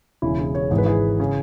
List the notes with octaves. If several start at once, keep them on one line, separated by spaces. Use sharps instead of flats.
E1 E2 C#3 E3 E4
E4 G#4
G#4 C#5
G#1 G#2 E3 G#4
B4
E4 G#4
C#3